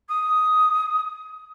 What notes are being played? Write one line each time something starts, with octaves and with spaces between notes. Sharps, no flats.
D#6